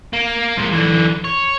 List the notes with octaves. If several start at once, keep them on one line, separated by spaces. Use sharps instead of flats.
A#3
F3 G#3
D3 E3
C#5